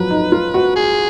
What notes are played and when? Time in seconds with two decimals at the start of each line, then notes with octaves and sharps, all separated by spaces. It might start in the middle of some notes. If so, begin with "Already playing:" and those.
Already playing: F3 F#3 B4
0.10 D#4
0.32 F4
0.54 F#4
0.76 G#4